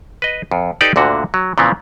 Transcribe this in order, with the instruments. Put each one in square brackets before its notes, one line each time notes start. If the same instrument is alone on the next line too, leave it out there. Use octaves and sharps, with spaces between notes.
[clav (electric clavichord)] B4 D#5
F2
D#4 G4 A4 B4 D5 G5
D2 A#2 D3 F#4
F#3
A#2 C#3 E3 F3 B3 C4